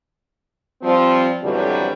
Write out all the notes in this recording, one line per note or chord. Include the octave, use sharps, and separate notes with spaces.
F3 G3 C4
F2 B2 D3 E3 F#3 G3